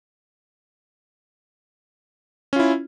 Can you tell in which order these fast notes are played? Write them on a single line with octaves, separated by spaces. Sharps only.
C#4 F4 E4